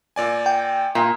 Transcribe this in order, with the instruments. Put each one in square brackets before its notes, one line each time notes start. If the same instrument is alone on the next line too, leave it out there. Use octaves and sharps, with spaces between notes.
[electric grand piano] A#2 D5 G#5
[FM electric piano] G5
[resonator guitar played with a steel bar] A#2